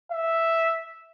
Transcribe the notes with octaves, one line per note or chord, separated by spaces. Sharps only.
E5